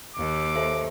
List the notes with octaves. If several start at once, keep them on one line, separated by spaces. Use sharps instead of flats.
D#2 D6
A4 C5 E5